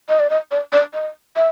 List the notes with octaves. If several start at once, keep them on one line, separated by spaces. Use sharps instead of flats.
D#5
D5
D#5
D5
D5
D#5
E5